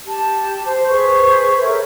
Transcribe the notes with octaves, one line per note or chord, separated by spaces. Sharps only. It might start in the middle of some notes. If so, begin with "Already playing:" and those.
G4 A5
C5
G#4 B4 C5 C#6
A4 A#4 C#5 E5